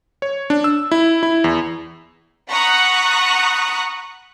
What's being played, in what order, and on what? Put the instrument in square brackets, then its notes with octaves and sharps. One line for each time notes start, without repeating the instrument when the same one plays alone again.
[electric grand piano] C#5
D4
E6
E4
E4
E2
[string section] F#5 A#5 B5 C#6 D#6 F#6